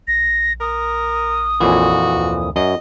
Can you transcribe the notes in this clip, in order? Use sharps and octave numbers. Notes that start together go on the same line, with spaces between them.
A#1 A#6
A#4 D#6
F2 A#2 E3 F#4
D2
F#2 D#5